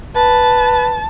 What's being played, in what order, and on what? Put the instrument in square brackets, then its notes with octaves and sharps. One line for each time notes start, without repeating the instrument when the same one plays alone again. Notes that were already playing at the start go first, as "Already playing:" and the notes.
[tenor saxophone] B4 [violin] A5